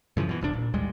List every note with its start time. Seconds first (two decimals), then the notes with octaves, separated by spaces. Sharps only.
0.17 F#2 C#3 E3 F3
0.29 B2 E3
0.41 E1 C2 C#3 D4
0.53 A#2
0.74 A1 D#2 G3 G#3